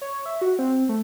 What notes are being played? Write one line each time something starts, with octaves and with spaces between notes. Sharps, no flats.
C#5
E5
F#4
C4
A3